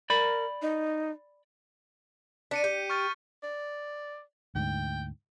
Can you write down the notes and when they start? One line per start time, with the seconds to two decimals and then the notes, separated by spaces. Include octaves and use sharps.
0.10 A#4 D5 B5
0.62 D#4
2.51 D4 B6 C#7 D#7
2.64 G4 G6
2.90 C#6 F6 A6
3.43 D5
4.55 D2 G#2 G5